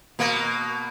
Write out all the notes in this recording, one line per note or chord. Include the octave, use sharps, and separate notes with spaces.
B2 A#3